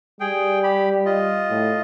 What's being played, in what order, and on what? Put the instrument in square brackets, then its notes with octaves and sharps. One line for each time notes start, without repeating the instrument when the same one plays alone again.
[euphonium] G3 [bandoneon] G#4 G5
[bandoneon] G4 B5
F4 D#5
[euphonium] A2